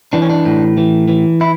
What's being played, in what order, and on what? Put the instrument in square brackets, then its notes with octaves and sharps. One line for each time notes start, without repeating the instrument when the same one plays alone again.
[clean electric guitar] E3 D4
C#4
D4
A2
E3
E3
E4